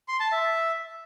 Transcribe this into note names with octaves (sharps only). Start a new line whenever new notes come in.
C6
A5
E5